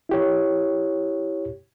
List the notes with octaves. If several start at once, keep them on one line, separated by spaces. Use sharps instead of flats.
E4 G4 C#5